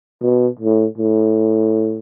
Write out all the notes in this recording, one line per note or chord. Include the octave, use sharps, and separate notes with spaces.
B2
A2
A2